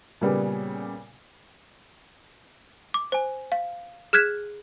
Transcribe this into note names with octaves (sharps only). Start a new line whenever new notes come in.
A#2 C#3 G3 B3
D6
C5 G#5
F5
G#4 F6 F#6 G#6 B6 E7